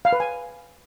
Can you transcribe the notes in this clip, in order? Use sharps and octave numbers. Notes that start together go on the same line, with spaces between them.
F5
B4
G#5